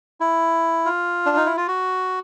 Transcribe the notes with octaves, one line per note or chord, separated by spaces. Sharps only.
E4
F4
D4
D#4
E4
F4
F#4